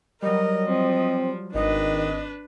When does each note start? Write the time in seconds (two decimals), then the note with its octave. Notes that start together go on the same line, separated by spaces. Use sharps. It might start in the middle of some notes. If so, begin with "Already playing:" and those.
0.22 F#3 G3 A#4 D#5
0.69 F3 C4
1.54 G#1 D#3 D4 B4 D#5